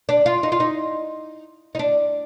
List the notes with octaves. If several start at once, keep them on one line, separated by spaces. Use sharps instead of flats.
D4
F4
D#4
F4
D#4
D#4
D4